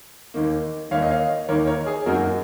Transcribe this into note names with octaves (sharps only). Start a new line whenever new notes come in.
D#2 D#3 A#3
D#2 D#3 A#3 C#5 F5
D#5
C#5 F5
D#2 D#3 A#3 A#4 C#5
A#4 C#5
G#4
F#2 D#3 F#3 A#3 F#4 A#4